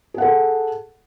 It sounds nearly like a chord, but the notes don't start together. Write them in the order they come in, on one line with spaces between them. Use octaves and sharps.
G#4 F#5 A4